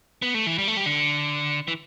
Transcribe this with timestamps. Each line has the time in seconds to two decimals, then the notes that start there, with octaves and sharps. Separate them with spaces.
0.22 B3
0.34 A3
0.47 E3
0.59 G3
0.68 A3
0.77 G3
0.86 D3
1.68 E3